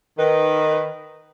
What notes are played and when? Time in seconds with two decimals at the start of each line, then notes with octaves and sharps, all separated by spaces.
0.18 D#3 B4